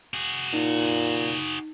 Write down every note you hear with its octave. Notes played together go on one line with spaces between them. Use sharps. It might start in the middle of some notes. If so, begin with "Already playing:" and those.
F#4 G#4
A#2 D#4